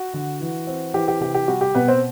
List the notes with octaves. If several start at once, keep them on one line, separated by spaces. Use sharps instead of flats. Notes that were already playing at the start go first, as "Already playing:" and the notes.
Already playing: F#4
D3
E3
C4
E3 G4
G4
C3 G4
G4
G3 F#4
G4
B2 B3 B4
C4 C5